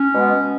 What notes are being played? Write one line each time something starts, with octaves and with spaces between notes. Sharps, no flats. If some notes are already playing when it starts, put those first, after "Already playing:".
Already playing: C#4
B2 G#3 B3